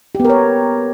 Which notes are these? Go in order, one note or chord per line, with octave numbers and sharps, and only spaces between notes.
B3 G4 A#4 C#5